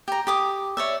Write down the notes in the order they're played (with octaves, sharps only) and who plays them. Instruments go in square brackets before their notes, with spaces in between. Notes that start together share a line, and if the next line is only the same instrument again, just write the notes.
[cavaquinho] G4 A#5
G4 D6 D#6
C#5 D5 E5